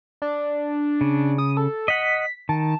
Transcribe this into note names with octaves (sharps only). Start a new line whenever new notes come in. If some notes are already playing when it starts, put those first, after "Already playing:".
D4
C#3
D#6
A4
D#5 F#5 B6
D#3 A5